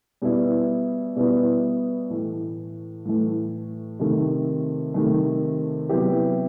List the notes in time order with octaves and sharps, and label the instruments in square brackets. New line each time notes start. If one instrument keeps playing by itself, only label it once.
[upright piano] B2 G3 B3 E4
B2 G3 B3 E4
A2 E3 A3
A2 E3 A3
C3 D#3 A3
C3 D#3 A3
C3 F#3 B3 E4 G4